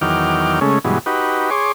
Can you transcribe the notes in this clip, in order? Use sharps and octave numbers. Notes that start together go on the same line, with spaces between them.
E2 D#3 F#3 G5 D6 F6
C#3 G#3 A3 C#4
G2 B2 E3 F#3 G#3
D#4 F#4 G4 B4
G#4 C#5 C6 D6